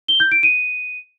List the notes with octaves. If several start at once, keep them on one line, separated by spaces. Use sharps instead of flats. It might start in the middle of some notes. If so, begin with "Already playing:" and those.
G7
G6
D7
D#7